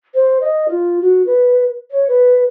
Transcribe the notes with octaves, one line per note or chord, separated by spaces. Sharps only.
C5
D#5
F4
F#4
B4
C#5
B4